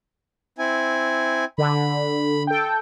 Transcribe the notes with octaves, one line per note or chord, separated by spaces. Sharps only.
C4 E4 G#5
D3 B5
A4 G5